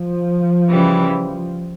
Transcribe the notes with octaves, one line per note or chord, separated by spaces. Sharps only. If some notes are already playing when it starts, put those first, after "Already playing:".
Already playing: F3
C#3 E3 G3